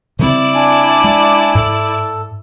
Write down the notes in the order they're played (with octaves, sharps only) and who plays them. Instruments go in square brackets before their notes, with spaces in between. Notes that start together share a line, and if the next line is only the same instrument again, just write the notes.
[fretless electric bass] C#3 G3 C4 [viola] E4 D5
[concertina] D4 G#5
[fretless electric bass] G#3
[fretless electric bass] G#2 [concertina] A4